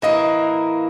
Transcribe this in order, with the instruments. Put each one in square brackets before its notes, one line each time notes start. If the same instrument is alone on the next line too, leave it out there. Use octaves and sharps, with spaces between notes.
[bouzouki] E3 A#3 E4 [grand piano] D#5